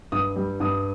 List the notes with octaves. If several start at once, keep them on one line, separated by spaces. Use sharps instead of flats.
G2 D#6
G3
G2 D#6